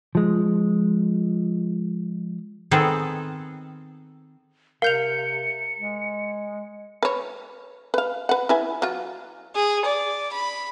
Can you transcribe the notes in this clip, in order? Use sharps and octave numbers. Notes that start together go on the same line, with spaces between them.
F3 G#3
D#3 B3 C4 G#4 A4
C3 A#4 F5 G6 C#7 F7
G#3
B4 C#5
B4 F5
B4 F#5
E4 B4 G#5
F#3 F4
G#4
D5
B5